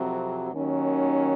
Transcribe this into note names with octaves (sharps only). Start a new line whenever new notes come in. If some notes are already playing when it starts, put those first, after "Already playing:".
Already playing: F2 C3 F#3
D#2 D#3 F#3 C#4